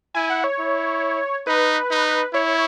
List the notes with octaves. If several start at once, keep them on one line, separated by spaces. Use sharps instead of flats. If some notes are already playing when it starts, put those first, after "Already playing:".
E4 G#5
F#5
C#5
E4
D#4 B4
D#4
E4 C#5